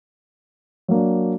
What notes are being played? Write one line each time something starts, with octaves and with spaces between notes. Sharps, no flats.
F#3 A#3 D4